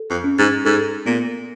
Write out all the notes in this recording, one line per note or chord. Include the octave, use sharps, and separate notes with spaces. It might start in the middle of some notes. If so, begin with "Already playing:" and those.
Already playing: A4
F2
C#4
G#2
G#2 A4
A#2 B3